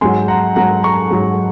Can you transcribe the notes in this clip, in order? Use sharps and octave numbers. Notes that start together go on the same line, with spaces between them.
G#2 F#3 G#5 C6
F#5 A#5
G#2 F#3 F#5 A#5
A#5 C#6
G#2 F#3